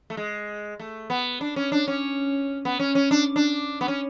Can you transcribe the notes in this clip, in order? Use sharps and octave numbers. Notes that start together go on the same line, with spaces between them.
A3
G#3
A3
B3
D4
C#4
D4
C#4
B3
C#4
C#4
D4
D4
B3
C#4